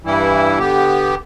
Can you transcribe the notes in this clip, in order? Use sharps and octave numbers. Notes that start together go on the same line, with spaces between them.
G2 E3 G3 E4
D3 B3 G4